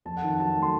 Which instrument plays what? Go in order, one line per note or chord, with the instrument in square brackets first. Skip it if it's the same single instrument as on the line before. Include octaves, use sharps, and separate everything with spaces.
[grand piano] F2 A5
F#5
D#3
A5
F#3 A5
A3
C6